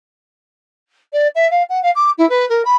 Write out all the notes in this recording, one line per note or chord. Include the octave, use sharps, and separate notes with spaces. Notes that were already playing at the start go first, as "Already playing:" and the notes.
D5
E5
F5
F#5
F5
D6
E4
B4
A#4
B5